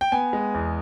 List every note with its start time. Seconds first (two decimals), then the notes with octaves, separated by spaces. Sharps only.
0.01 G5
0.12 B3 G#5
0.33 G#3
0.54 E2